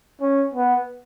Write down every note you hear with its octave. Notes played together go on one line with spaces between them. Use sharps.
C#4
B3